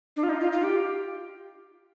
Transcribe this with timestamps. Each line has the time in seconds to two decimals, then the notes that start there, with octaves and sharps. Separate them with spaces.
0.16 D4
0.23 F4
0.29 D#4
0.40 F4
0.52 F4
0.63 G4